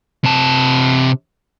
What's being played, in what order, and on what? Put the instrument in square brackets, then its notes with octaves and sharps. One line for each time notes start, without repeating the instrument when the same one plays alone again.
[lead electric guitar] C3 A5